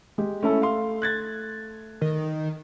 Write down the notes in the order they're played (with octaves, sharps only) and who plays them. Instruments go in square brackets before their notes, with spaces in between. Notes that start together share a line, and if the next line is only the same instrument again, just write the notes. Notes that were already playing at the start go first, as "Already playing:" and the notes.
[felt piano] G#3 G4
[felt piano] A3 [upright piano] C#4 E4 A4
[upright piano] F5 C6
F#6 G#6 A6
[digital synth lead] D#3